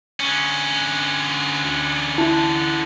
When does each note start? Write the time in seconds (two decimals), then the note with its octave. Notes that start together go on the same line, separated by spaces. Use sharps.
0.20 D3 C#4
1.64 D2
2.18 E4 A5